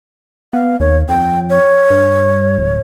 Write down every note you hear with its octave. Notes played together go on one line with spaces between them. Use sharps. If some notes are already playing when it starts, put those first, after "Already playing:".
B3 F5
D#2 C#5
F2 G5
C#5
G2
D1